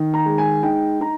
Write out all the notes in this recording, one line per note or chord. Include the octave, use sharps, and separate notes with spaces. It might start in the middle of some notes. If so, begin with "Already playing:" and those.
Already playing: D#3
A#5
G#3
G#5
D#4 G5
D#4 A#5